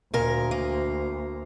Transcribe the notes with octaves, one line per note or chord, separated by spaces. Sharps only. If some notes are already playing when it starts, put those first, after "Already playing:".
D2 A#2 A#4
A#3